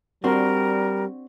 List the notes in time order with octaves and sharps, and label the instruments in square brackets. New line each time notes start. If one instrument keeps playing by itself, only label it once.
[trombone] G3 [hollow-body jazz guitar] C4 D4 F#4 [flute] A#4